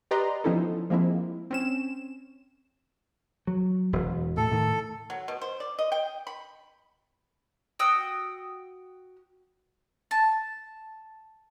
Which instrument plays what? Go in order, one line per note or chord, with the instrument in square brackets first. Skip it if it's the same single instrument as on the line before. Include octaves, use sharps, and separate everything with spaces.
[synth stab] G4 B4 D5 D#5 A#5 C6
F3 B3 C#4 D#4 E4 A4
F3 G#3 A#3 C4 E4
C4 C#4 E7
[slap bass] F#3
E1 B2
[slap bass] A2 [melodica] A4
[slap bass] A2 D#3
[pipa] F#3
B2
C5
D5
D#5
G5
B5
[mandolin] F#4 G5 D#6 E6
A5